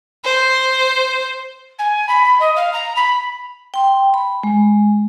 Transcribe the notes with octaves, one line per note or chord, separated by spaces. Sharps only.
C5
G#5
B5
B5
D#5
F5
A#5
B5
G5 C6
B5
G#3